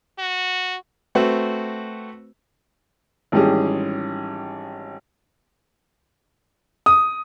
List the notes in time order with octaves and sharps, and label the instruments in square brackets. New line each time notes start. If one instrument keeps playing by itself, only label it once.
[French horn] F#4
[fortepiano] A3 C4 F#4 B4
G#1 E3 G3 C#4 G4 G#4
[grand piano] D#6